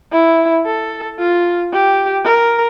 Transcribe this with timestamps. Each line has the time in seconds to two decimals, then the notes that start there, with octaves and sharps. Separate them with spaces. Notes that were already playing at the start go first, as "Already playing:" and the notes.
0.13 E4
0.66 A4
1.19 F4
1.72 G4
2.25 A#4